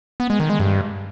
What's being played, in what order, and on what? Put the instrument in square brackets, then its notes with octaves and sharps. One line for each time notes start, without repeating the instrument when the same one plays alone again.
[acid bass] B3
G#3
D#3
G#3
G2